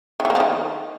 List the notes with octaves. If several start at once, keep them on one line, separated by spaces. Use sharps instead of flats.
D#3
E3
A#3
F3
D#3